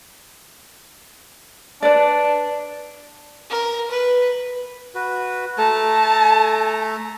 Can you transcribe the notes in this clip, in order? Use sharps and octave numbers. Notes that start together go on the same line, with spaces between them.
D4 B4 D5
A#4
B4
F#4 B4
A3 A4 A5 A#5